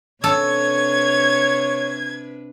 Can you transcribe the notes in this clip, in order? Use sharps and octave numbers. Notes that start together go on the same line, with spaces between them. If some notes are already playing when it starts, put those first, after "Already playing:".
C3 D4 A4 B4 C#5 G#6